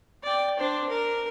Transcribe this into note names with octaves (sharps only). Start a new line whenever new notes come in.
D5 G5
D4 C5
A#4